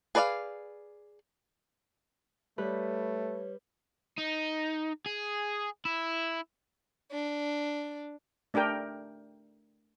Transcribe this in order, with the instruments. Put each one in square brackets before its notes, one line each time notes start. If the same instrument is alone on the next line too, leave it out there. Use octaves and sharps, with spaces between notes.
[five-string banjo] G#4 B4 D5 D#5 F5
[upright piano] G3 [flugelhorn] A3 [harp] B4 [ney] C#5
[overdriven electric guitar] D#4
G#4
E4
[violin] D4
[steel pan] A3 D4 G4 A#4 G5